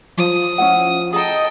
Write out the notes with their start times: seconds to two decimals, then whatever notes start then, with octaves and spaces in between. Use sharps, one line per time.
0.17 F3 D#6
0.58 C#4 E4 F#5
1.13 G#4 A4 D#5 G5 A#5